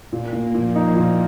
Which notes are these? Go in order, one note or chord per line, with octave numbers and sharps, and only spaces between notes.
A#2 A#3
A#2
A#2 F3
D#4
A#2